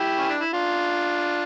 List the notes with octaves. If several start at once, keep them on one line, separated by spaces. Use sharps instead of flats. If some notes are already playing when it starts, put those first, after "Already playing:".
Already playing: E4 G4
C#4
D4
E4
D4 F4